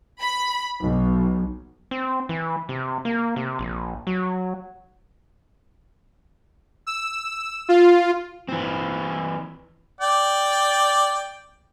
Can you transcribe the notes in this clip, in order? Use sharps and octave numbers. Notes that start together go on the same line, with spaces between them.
B5
B1
C4
E3
C3
A#3
C3
A#1
F#3
E6
F4
E3 C4
D5 G5